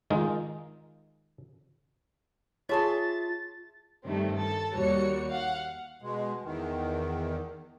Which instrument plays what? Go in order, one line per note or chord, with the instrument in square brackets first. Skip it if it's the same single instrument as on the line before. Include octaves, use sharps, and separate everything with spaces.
[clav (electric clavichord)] D#3 G#3 D#4 F4
[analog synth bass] F4 [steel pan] G#4 C#5 [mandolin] E5 A5 C6 [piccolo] A6
[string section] G2 D#3 G3 A3 C4
A4 A5
D#2 G3 F#4 C#5 C#7
F5 F#5
[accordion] B2 G#3
E2 D#3